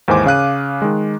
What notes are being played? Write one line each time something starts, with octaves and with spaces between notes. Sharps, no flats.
D#2 G#2 E3 C5 G#5 D6
C#3 F5 F#6 D#7
D#3 G#3